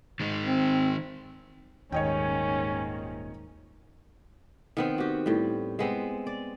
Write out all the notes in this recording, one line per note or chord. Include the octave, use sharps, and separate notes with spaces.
D#3 G#3 D#4
C4
D#1 D#2 G#2 D#3 C#4 C#5 D#5 G5
D#3 B3 C4
F#4 G4
A2 G3
G#3 B3 C4
D5